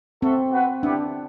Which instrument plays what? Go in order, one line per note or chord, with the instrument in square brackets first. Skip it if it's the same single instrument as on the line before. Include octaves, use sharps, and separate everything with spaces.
[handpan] C4 [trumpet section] F#4 A4 E5
[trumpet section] B3 F#4 B4 F#5
[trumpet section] B3 E4 G4 [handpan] D4